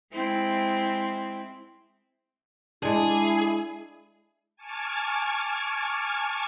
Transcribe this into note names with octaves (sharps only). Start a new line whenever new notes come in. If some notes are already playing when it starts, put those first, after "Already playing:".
G#3 C4 E4
G#3 D4 E4 G#4
G#5 A5 C#6 D6 F6 G#6